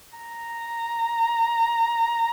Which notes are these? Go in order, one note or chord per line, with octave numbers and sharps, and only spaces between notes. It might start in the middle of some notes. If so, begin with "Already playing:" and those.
A#5